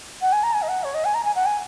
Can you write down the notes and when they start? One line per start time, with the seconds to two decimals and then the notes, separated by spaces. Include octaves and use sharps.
0.22 F#5
0.32 G#5
0.43 A#5
0.53 G#5
0.62 D#5
0.68 F#5
0.84 C#5
0.94 D#5
1.05 G#5
1.14 A#5
1.25 G#5
1.35 F#5
1.46 G#5